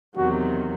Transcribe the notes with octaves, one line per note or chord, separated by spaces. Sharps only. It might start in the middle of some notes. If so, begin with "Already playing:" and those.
E2 C3 D#3 F#3 F#4